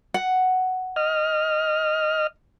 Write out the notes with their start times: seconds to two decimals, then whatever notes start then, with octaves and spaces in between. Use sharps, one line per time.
0.14 F#5
0.96 D#5 F6